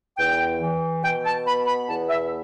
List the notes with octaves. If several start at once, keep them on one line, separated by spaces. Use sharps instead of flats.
E2 G5
E3
B2 G5
A5
B3 B5
B5
E2 A5
E5